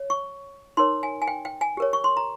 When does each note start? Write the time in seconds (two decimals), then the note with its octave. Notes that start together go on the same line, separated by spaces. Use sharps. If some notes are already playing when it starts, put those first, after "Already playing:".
Already playing: C#5
0.10 C#6
0.77 D#4 A#4 C#5 C6
1.03 G#5
1.22 G#5
1.27 G5
1.45 G5
1.61 G#5
1.77 G4 A#4 C#5
1.93 C#6
2.04 C6
2.17 A#5